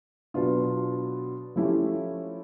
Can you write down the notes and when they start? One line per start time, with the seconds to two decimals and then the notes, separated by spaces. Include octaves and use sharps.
0.34 B2 F#3 B3 D4 F4
1.56 F3 A3 C#4 E4 G4